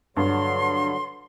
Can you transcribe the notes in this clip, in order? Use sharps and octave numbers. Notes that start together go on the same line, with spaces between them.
G2 D3 F#3 C6